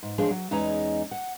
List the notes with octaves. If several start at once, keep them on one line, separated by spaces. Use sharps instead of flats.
G#2
F3 G#3 D4 G#4 C#5
F#3
E2 G#3 C#4 D#4 D#5 A#5
F#5